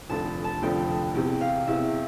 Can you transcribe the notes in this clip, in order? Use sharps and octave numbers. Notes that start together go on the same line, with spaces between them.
F1 F2 D3 F3 A5
A5
F1 F2 D3 F3 G5
E2 C3 E3 G5
F5
E2 C3 E3 E5